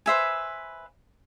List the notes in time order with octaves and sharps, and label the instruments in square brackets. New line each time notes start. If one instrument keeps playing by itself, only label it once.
[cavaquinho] B4 C5 E5 G#5